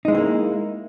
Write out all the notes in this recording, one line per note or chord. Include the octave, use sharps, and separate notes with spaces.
G#3 A#3 C4 D#4 E4